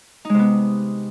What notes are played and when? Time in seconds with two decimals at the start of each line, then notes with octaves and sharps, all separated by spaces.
0.25 D#4
0.30 G#3
0.34 C3
0.39 B3